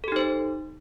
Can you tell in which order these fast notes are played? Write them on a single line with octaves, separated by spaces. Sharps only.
A4 G4 D#4 C5